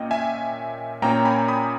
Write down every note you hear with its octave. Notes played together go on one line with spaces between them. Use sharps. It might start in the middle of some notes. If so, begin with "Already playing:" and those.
Already playing: A#2 A#3 C#4 D#5 G5
E5 G#5
A#2 A#3 C#4 G5 A#5
G#5 B5
B5 D#6